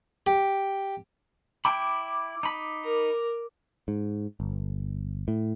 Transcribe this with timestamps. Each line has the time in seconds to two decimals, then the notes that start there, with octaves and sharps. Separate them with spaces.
0.27 G4
1.65 E4 G5 B5 D6
2.43 D#4 B5
2.84 A#4
3.88 G#2
4.40 G1
5.28 A2